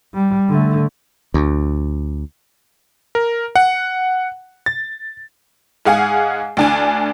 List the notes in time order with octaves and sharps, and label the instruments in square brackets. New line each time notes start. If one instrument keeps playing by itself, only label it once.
[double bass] G3
D3 A3
[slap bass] D2
[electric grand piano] A#4
F#5
A6
[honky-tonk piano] G#2 G#4 F5 F#5 G#5
D2 D4 G#5